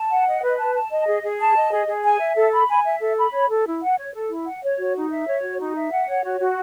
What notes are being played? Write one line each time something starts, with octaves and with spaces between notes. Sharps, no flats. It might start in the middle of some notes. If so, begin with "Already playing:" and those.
Already playing: A5
F#5
D#5
B4
A5
A5
D#5
G#4
G#4
A5
D#5
G#4
G#4
G#5
E5
A4
B5
G#5
E5
A4
B5
C#5
A4
E4
F#5
C#5
A4
E4
F#5
C#5
F#4
D#4
E5
C#5
F#4
D#4
E5
F#5
C#5
F#4
F#4